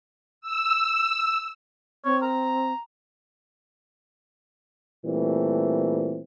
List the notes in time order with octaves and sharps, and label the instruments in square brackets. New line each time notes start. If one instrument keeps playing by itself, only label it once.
[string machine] E6
[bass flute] C4 [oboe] C#5
[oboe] A#5
[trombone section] A#2 E3 G3 A3 C4